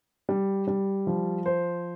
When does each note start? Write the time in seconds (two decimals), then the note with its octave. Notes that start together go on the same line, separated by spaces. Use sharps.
0.29 G3
0.67 G3
1.07 F3
1.46 C5